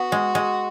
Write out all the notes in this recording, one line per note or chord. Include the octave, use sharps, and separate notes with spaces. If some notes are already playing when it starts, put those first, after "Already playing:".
Already playing: B3 F#4
G#3
G#3